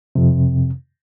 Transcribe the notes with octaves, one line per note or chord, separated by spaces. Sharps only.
F2 C3